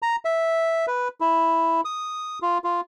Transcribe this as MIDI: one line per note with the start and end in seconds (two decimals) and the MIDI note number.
0.02 0.16 82
0.25 0.86 76
0.87 1.08 71
1.21 1.81 64
1.85 2.39 87
2.42 2.58 65
2.64 2.81 65